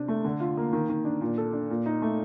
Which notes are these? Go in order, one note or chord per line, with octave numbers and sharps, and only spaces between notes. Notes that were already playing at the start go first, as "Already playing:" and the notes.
Already playing: C3 D4
A3
D3
F4
A#3
D#3
D#3
D4
A#2
A4
D4
A#2
D#4
A3